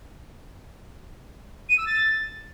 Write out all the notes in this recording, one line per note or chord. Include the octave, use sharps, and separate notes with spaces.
D#7
E6
A6